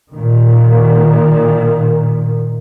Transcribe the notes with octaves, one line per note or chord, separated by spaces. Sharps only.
A#2 D#3